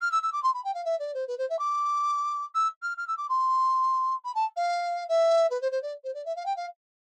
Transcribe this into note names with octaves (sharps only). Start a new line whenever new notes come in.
F6
E6
E6
D6
C6
B5
G5
F5
E5
D5
C5
B4
C5
E5
D6
E6
F6
F6
E6
D6
C6
B5
A5
F5
E5
B4
C5
C5
D5
C5
D5
E5
F5
G5
F5